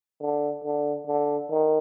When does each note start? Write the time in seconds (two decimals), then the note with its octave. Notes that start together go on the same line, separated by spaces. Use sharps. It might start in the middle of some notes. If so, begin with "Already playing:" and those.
0.21 D3
0.64 D3
1.07 D3
1.50 D#3